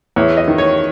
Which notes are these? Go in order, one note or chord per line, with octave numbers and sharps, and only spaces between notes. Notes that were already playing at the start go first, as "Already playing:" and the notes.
E2 C#5
D#5
D#3
C#5